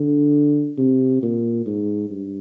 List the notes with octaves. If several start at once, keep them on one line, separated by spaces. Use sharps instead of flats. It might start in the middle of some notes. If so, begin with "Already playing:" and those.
Already playing: D3
C3
A#2
G#2
G2